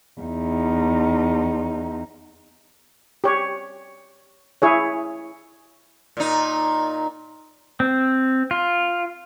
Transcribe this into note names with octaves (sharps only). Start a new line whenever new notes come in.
E2 D#4
G4 C#5
E4 G#4 C#5
A#2 D#4
C4
F4